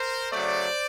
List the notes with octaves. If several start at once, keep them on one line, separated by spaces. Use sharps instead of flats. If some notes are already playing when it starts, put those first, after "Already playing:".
Already playing: A#4 C5
C#3 F#3 A3 C5 D5